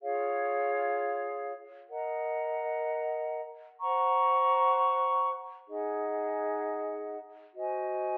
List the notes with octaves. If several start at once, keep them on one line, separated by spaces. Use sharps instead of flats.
F4 G#4 C#5 F5
A#4 D#5 F#5 A#5
C5 F#5 A#5 C#6
D#4 G#4 D#5 F#5
F#4 C5 D#5 G#5